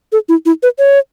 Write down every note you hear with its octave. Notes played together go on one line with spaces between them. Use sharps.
A4
E4
E4
B4
C#5